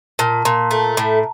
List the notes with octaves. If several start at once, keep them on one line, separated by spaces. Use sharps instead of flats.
A#2 A5
A#2 A#5
A3
A2